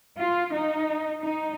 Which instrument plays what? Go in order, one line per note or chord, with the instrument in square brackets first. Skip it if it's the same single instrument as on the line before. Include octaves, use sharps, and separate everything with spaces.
[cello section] F4
D#4
D#4